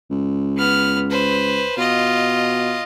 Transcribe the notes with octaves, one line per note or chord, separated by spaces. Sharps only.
C#2
B3 F6
B4 C5
B2 F4 D#5